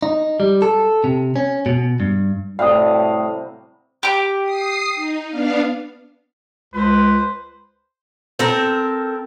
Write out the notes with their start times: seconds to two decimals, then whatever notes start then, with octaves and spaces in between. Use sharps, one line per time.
0.03 D#4
0.40 G3
0.62 A4
1.04 C3
1.36 C#4
1.66 B2
2.00 G2
2.59 A2 C3 F#3 G3 F5 D#6
4.03 G4 D6
4.43 D#6 C7
4.95 D#4
5.29 B3 D4 F5
6.74 C#2 B4 C5
8.39 C4 A4 A#4